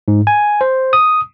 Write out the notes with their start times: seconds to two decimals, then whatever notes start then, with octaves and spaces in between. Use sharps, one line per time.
0.08 G#2
0.27 G#5
0.61 C5
0.93 D#6